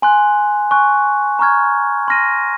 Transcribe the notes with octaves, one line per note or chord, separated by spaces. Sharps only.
G#5 C6 F#6
G#5 C#6 F#6
A#5 C#6 F6 G#6
C6 F6 A#6 D#7